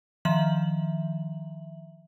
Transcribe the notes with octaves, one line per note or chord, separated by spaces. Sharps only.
D#3 F3 E5 F#7